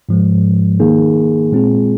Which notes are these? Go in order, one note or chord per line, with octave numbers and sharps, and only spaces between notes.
G#2 F3 G#3
D#3 A#3 D#4 G#4
A#2 G#3 C4 F4 G#4